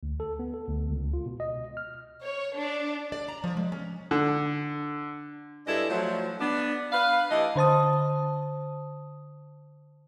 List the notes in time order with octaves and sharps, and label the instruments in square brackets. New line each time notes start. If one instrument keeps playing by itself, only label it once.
[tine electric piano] D2
A4
B3
A4
D2
C#2
F4
B2
D#5
F6
[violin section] C#5
D4
[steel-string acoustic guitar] D5
A#5
F3
G#3
C#4
[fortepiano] D3
[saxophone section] G2 G#3 D4 E4 A4 D#5
F3 F#3 A3
B3 D4
B4 F5
E3 A3 E4 G4 D#5
[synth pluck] D3 C5 A5 D#6